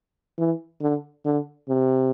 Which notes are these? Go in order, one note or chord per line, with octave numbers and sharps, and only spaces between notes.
E3
D3
D3
C3